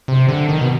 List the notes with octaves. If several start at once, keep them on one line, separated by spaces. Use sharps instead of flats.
C3
D3
D#3
B2